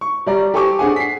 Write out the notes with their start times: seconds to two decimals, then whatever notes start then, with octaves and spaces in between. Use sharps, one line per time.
0.01 C#6
0.27 G3 D5 A#5
0.54 G4 A4 C5 G#5 C#6 D6
0.79 D4 G#4 F#5 G#5
0.96 B6 C7